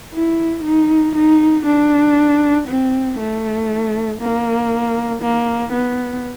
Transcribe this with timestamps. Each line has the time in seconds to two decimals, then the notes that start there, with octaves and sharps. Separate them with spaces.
0.14 E4
0.64 D#4
1.15 D#4
1.65 D4
2.68 C4
3.19 A3
4.20 A#3
5.22 A#3
5.72 B3